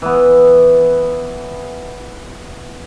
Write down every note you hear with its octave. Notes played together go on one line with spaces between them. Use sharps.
E3 B3